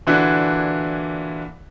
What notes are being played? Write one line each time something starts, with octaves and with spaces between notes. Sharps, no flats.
A#2 D3 E3 D4 E4 F#4